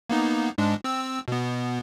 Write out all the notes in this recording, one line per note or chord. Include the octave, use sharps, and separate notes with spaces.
A#3 B3 D#4
G#2 G#3 D4
C4 E6
B2 B3